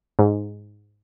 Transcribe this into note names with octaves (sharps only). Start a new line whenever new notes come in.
G#2